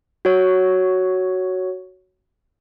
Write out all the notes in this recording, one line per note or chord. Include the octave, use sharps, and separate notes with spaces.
F#4 C#5